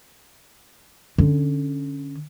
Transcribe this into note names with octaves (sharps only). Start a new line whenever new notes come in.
D3 C#4